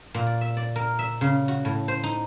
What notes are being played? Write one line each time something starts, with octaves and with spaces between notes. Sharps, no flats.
A#2
D5
E5
D5
A#4
E5
C#3
F#4
A2
C5
D#4